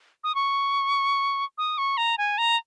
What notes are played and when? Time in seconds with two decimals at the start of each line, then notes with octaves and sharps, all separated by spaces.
0.24 D#6
0.35 C#6
1.58 D#6
1.78 C#6
1.97 A#5
2.18 G#5
2.38 A#5